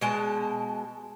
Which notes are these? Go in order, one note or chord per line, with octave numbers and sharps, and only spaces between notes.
B2 G#3 A5